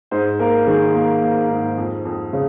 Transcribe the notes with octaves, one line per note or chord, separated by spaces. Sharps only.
G#2 C5
A#3 A#4
D#3 G#4
A#3
A#3
G#2
F2
F2
C#3